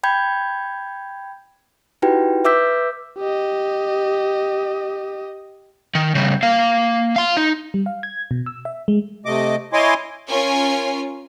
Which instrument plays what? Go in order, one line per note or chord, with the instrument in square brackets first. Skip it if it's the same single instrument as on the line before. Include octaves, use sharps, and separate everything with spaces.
[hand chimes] G5 B5 G6 G#6
D#4 E4 F#4 G4 B4 G5
B4 E5 D6 E6 G6 B6
[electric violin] G4 D#5
[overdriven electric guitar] D#3
C#3 G3
A#3 F5
F5 C6
D#4
[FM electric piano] G3
F5
G#6
B2
E6
E5
G#3
[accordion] C3 A3 D#5 D6
E4 C#5 D#5 G#5 C6 D6
[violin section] C#4 F4 A#4 G#5